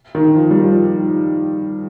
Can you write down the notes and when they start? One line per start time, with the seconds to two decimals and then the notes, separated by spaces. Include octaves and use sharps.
0.15 D#3
0.35 F3
0.51 G3
0.64 F3